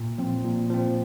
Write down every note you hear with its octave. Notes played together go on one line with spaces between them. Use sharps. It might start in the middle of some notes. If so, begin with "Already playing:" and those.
Already playing: A#2
F3 C4
A#2
F3 C4